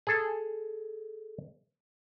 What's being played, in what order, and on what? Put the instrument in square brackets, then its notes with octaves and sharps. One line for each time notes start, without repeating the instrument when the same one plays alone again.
[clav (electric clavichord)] G#4 A4